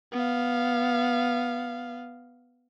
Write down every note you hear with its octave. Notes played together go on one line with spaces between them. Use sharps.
B3 F5